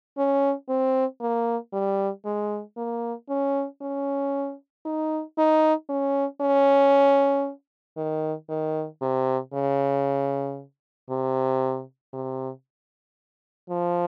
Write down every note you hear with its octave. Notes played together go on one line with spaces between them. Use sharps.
C#4
C4
A#3
G3
G#3
A#3
C#4
C#4
D#4
D#4
C#4
C#4
D#3
D#3
C3
C#3
C3
C3
F3